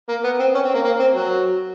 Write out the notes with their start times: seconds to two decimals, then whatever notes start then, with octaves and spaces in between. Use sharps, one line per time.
0.09 A#3
0.24 B3
0.39 C4
0.54 C#4
0.65 C4
0.74 A#3
0.85 A#3
1.00 C4
1.14 F#3